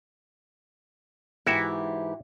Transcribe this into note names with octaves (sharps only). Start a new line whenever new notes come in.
G#2 E3 E4 F#4 G4 E5